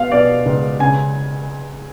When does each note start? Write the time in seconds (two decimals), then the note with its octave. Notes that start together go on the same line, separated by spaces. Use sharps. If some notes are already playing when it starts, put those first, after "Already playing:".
Already playing: B3 F5
0.12 B2 D5
0.46 C#2
0.80 C#3 G#5